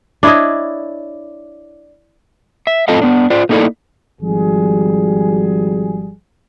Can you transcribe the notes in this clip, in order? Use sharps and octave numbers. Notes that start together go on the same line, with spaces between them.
D4 E4 C#5 D#5
E5
A2 C4 F4 A4 D#5 F5
B3 D4
F4 C5 D5
A3 A#3 D#4 E4 A4 D5
G#1 F3 G3 F#4 G#4